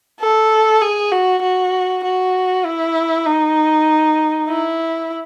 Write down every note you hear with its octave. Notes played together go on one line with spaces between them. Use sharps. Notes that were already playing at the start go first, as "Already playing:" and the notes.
A4
G#4
F#4
F#4
F#4
E4
D#4
E4